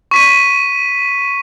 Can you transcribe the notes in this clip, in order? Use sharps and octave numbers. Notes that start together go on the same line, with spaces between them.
C#6 B6 D#7